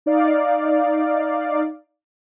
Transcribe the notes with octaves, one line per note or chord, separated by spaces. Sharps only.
D#4 D5 F5